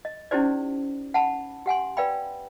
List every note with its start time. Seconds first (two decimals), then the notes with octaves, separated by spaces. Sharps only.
0.05 D#5
0.31 C#4 D#4 E4 G4 C5 D5
1.14 F#5 A5 B5
1.66 G4 F#5 G#5 C6
1.97 B4 D5 F5 G5 B5